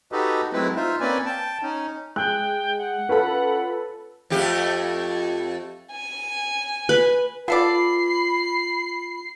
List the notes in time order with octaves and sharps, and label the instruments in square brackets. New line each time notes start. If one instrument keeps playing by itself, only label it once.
[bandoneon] D#4 F#4 G4 A4 B4 D#5
F#3 G#3 A3 C4 E4 B4
D#4 F4 C5 E5
A#3 C4 C#4 B4 D5 G#5
G5 A5
C#4 D#4
[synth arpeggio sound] G#3 G#4 [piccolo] G5 [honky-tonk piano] F#6
[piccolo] F#5
[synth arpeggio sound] C#4 F4 B5 [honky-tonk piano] A4 B4
[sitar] F2 A3 G4
[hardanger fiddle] G#5
[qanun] B4
[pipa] B3 A4 D5 [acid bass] F4 [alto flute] B5 [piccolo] C7